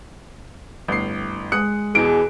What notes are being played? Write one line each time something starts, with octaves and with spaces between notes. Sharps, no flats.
G1 A2 C7
G#3 D#6 F#6 C#7
E2 B2 E3 G#4 D7